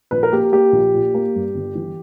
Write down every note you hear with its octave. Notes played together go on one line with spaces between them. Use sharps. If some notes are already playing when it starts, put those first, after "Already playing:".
A#1 B4
A#4
A#3 G4
A#3 G4
A#1
A#2
A#3
G2
G1
E3